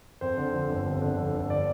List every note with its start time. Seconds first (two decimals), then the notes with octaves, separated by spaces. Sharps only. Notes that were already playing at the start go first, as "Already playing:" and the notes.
0.21 F2 C5
0.37 D3
0.54 F3
0.70 G1
0.86 F2
1.01 D3
1.18 F3
1.34 G1
1.50 D5